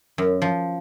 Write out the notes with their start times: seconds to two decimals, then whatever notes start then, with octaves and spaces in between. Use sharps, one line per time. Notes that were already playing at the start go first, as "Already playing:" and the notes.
0.18 F#2
0.42 F3